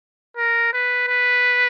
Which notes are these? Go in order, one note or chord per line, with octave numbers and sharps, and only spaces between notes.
A#4
B4
B4